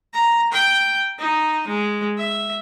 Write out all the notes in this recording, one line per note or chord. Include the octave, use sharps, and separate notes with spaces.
A#5
G5
D#4
G#3
E5